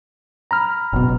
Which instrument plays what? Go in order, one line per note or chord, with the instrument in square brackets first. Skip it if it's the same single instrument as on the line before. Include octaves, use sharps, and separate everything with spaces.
[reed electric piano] A#5 B5 F6
[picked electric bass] F#1 B2